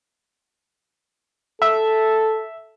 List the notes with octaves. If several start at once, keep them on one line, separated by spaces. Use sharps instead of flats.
A4 E5